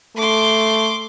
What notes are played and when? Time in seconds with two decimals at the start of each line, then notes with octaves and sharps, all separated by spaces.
0.16 A3 C6 D6